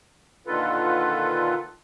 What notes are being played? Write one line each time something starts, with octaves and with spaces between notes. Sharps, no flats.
A#2 D3 D#3 F4 A4 B4